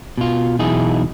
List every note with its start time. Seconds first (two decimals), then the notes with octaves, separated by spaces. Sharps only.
0.17 B2 F4
0.59 B1 E2 B2 D#4 E4 G#4